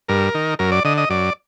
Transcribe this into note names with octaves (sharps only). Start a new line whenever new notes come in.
G2 A#4
D#3
F#2 A#4
D5
D3 D#5
D#5
F#2 D5